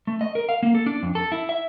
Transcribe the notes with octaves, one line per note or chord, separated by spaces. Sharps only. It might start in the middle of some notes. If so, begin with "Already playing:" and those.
A3
D#5
A#4
F5
A#3
A4
D4
F2
A4
E4
E5